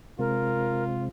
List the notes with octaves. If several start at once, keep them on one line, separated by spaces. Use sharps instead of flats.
C3 G#3 C4 F4 A#4